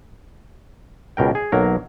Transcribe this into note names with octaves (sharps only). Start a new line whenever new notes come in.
C#2 B2 A#4 G5
G#4
B1 F#3 A#3 A#4